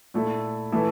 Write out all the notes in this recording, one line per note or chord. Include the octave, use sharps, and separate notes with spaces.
A#2 A3 E4
E3 A3 E4